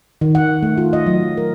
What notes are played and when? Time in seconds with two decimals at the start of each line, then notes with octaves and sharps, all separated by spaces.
0.21 D#3
0.35 F#5
0.63 A3
0.78 F4
0.93 D#5
1.06 F#3
1.37 A#4